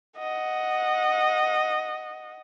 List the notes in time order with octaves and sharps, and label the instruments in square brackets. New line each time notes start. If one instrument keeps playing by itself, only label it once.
[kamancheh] D#5 F#5